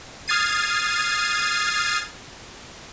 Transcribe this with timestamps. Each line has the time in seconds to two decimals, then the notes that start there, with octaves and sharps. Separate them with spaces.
0.28 D#6 F6 G#6 A6 C7 D#7